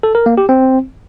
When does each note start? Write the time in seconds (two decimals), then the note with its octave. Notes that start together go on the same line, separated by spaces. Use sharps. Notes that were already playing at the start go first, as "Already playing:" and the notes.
0.03 A4
0.15 A#4
0.26 A#3
0.38 G4
0.49 C4